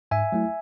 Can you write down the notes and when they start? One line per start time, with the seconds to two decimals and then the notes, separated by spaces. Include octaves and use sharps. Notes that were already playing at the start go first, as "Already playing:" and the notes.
0.11 G#2 E5 G#5
0.32 F#3 A3 E4